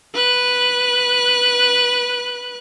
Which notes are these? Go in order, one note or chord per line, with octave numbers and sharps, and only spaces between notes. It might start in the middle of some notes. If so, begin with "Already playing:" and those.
B4 F#6